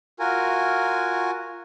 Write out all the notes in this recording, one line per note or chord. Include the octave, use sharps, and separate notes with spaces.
F4 F#4 A#4 G#5